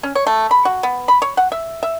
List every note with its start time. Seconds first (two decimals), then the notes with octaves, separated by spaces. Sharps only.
0.03 C#4
0.15 C#5
0.27 A3
0.51 B5
0.65 F#4
0.83 B3
1.08 B5
1.22 C#5
1.37 F#5
1.52 E5
1.83 E5